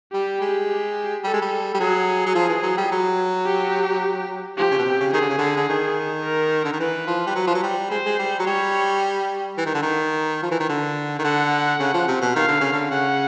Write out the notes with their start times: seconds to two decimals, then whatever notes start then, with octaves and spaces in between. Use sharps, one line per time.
0.13 G3 G4
0.41 G#3
0.68 G4
1.24 G3 A4
1.33 G#3
1.41 G3
1.74 G3
1.79 F#3 G#4
2.26 F#3
2.35 F3
2.49 E3
2.62 F#3
2.77 G3
2.91 F#3
3.46 G4
4.57 F3 G4
4.71 C#3
4.78 B2
4.85 C3
5.00 C#3
5.13 D#3 G#4
5.21 D3
5.29 C#3
5.38 D3
5.57 D3
5.69 D#3
6.24 A#4
6.64 D3
6.72 D#3
6.79 E3 B4
7.07 F3
7.26 G3
7.35 F#3
7.47 F3
7.55 F#3
7.62 G3
7.90 G#3 C5
8.05 G#3
8.18 G3
8.39 F#3
8.46 G3 C#5
9.57 E3
9.65 D#3
9.74 D3
9.82 D#3
10.42 F3
10.51 E3
10.60 D#3
10.69 D3
11.19 D#3
11.24 D3 F#5
11.79 C#3
11.94 F3
12.07 C3
12.21 B2
12.35 D#3 F5
12.48 D3
12.60 C#3
12.72 D3
12.90 C#3 F#5